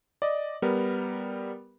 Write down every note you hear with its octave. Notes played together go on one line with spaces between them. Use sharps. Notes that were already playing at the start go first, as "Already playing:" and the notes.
D5 D#5
G3 B3 A#4